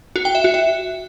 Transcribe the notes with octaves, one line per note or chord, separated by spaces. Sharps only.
F#4
G5
E5
F#4
E5